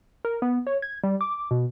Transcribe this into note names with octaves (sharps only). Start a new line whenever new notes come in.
A#4
B3
C#5
G#6
G3
D6
B2